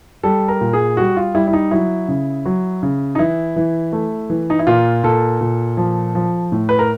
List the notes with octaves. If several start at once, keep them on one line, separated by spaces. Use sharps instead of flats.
G3 A4
A#4
A#2
G#4
G3 F#4
F4
G3 E4
E4
D#4
F#3 E4
C#3
F#3
C#3
D#4
E3 E4
E3
A3
E3
D#4
E4
A#2 F4
A#2 A4
A#2
F3
F3
A2
B4
A#4